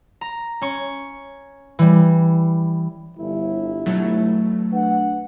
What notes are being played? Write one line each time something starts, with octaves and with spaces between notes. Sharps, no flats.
A#5
C#4 C#6
E3 G3
G1 E4
B2 F#3 A3
D4 B4 F#5